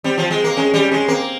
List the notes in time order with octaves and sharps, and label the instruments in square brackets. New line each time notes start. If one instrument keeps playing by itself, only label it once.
[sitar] G3 [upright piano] C4
[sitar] F3
G#3
A#3
[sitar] G#3 [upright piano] C#4
[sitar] G3
[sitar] G#3 [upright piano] C#4
[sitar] A#3 [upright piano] C4